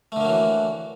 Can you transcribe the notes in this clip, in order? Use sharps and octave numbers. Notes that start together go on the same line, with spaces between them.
D3 E3 F#3 A3 A#3